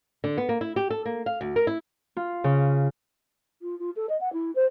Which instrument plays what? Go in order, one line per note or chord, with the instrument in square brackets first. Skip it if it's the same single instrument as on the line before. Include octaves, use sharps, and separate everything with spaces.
[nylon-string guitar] D3
B3
A#3
E4
G4
A4
A#3
F5
D2
A#4
E4
[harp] F4
C#3
[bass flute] F4
F4
A4
D#5
F#5
E4
C5